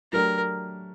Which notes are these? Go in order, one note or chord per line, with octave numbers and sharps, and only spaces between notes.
F#3 A3 D4 G4 A#4